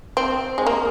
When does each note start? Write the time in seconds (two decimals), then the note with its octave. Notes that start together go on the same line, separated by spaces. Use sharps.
0.17 C4
0.58 G#3
0.66 A#3